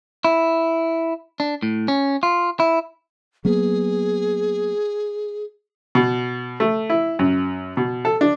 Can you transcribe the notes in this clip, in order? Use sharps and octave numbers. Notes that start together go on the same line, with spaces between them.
E4
D4
A2
C#4
F4
E4
F#3 A#3 B3 G#4
B2
A3
E4
F#2
B2
A4
D4